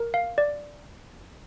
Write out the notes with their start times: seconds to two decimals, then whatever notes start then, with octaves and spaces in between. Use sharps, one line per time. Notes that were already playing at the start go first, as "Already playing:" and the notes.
Already playing: A#4
0.14 F5
0.38 D5